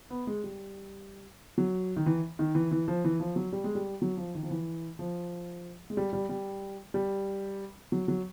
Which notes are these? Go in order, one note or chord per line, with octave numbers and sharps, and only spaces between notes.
B3
G#3
G3
F#3
D#3
E3
D#3
E3
E3
F3
E3
F3
F#3
G3
G#3
G3
F#3
F3
D#3
F3
E3
F3
G#3
G3
G3
G3
G3
F#3
F#3